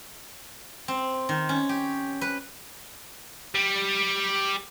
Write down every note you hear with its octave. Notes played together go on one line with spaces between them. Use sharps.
C4
D#3
C#4
G4
B4
G3